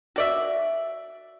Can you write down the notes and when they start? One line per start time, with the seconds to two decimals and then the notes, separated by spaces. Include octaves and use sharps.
0.16 F#4 D5 E5